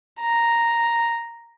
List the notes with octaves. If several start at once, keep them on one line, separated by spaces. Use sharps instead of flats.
A#5